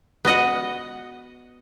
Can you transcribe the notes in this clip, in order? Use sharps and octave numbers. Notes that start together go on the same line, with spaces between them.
B3 F#4 D#5 F#5